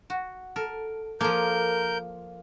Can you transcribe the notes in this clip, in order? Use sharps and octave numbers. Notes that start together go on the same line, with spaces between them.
F#4
A4 A#4
F3 A#3 A4 A#4 G6